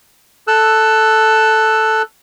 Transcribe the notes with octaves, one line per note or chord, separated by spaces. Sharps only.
A4 E6 F#6